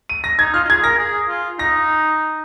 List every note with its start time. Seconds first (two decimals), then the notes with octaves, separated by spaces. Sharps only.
0.09 D#7
0.24 A#6
0.39 D#4 G#6
0.54 F4 F6
0.64 F4
0.70 G#4 G#6
0.84 A#4 A#6
0.99 G#4
1.29 F4
1.59 D#4 A#6